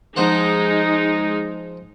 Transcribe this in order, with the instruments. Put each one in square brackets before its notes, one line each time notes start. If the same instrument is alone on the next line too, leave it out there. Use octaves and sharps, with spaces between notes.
[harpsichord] F3 C5 F#5 [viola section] G#3 D#4